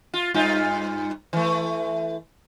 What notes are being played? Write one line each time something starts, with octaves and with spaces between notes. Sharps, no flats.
F4
G2 D#4 F4
E3 A3